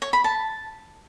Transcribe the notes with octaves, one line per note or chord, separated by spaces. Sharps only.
C#5
B5
A5